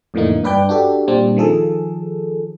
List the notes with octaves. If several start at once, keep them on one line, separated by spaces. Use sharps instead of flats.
F2 A2 D3 E3 A#3 D#4
G2 D4 B4 D5 G5 G6
D4 F#4 G4 A4
A#2 G3 C4 D4
D#3 F3 G#4 A4